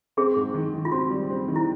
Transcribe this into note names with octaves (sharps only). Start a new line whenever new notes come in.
C4 G#4
G#2
D#3
D#3
F4
C4 F#4
G3
C4
D#3
E4